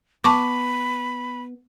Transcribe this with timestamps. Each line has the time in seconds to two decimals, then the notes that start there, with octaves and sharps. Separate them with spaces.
0.24 B3 A5 B5 C#6 D6